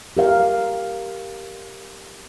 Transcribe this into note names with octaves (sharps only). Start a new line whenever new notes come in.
G4 A#4 F5